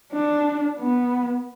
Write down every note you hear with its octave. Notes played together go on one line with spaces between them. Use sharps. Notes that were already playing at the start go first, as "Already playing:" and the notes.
D4
B3